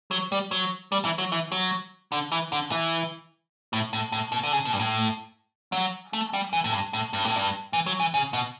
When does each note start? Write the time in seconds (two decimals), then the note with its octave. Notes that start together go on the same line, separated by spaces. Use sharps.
0.11 F#3
0.32 G3
0.51 F#3
0.92 G3
1.05 E3
1.18 F#3
1.32 E3
1.52 F#3
2.12 D3
2.32 E3
2.52 D3
2.71 E3
3.73 A2
3.93 A2
4.12 A2
4.32 B2
4.43 D3
4.52 C#3
4.65 B2
4.73 G2
4.79 A2
5.72 F#3
6.13 A3
6.33 G3
6.53 E3
6.64 A2
6.72 G2
6.93 A2
7.13 G2
7.25 A2
7.37 G2
7.73 E3
7.86 F#3
8.00 E3
8.14 C#3
8.33 B2